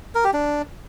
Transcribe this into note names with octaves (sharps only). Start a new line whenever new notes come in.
A#4
G4
D4